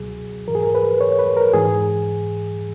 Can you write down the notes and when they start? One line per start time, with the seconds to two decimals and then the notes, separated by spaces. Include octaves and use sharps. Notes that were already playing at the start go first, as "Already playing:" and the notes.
Already playing: C#2 B2 F#3 G#4
0.48 G#2 E3 A#4
0.55 G#4
0.63 A#4
0.75 B4
1.01 C#5
1.19 B4
1.37 A#4
1.54 G#2 E3 G#4